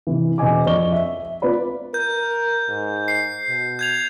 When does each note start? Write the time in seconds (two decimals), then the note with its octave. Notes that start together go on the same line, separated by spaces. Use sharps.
0.07 C3 E3
0.38 E1 G#4 D#5 G#5 D6
0.66 F2 D5 D#5 C#6 G7
0.92 E5
1.23 E5
1.42 C4 F4 B4 D5 B5
1.94 A#4 G6
2.69 G#2
3.08 C7
3.48 B2
3.79 G6 G#6 F7